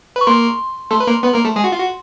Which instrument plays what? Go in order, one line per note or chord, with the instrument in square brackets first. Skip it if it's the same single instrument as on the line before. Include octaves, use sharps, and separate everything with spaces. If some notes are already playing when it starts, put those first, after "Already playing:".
[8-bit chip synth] B4 [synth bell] C#6
[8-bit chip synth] A#3 A#4 [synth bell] C6
[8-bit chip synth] A3 A4 [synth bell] C6
[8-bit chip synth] B4
A#3 A#4
B3 B4
A#3 A#4
A3 A4
G#3 G#4
F#4
F4
F#4